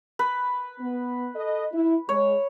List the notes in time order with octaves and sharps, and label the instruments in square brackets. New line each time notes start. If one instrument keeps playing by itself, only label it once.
[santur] B4
[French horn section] B3
A4 D#5
E4
[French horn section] G#3 [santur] C#5